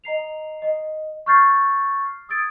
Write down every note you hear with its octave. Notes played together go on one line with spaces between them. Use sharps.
D#5 A#5 C7 F7
D#5
C#6 D6 F6 G6 A6 C7
D#6 E6 G#6 A6 D7